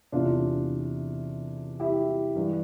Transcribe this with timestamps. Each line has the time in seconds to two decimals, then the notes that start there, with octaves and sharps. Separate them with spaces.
0.12 E2 C3 E3 D4 F4
1.80 E4 G4
2.35 G2 E3 G3